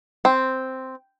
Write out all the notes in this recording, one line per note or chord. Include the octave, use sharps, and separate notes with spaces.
C4